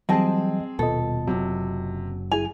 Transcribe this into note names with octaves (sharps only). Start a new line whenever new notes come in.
E3 F#3 G3 C4 G#4 D#5 G5 A5
D#1 B2 F4 A4 D#5
F#1 D#2 C3 F#3
E4 G#4 G#5 F7